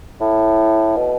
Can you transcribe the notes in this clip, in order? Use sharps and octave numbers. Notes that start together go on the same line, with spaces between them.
A2
B2